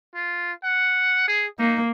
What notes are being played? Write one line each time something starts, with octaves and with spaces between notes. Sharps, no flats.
F4
F#5
G#4
A#3 D#4